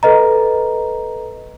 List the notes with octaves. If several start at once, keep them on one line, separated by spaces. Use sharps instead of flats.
A4 B4 D#5 A#5